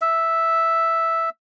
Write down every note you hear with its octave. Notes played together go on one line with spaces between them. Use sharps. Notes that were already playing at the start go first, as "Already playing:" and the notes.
E5